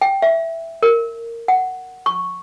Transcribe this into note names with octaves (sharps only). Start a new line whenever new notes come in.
G5
E5
A#4
F#5
C#6